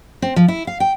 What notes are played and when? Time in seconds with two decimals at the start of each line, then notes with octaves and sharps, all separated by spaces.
0.22 C4
0.36 F3
0.48 E4
0.67 F5
0.80 G5